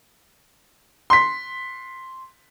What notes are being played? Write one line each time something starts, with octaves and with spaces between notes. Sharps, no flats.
C6 B6